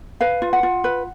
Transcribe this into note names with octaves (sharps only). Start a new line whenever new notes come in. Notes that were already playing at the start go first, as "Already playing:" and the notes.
B4 F5
F4
F#5
F4
B4